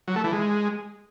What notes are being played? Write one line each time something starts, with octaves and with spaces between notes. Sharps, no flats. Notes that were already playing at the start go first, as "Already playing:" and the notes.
F#3
A3
E3
G#3